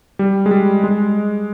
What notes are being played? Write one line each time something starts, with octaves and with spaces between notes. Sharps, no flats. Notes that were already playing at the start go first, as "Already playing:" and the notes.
G3
G#3
G3
G#3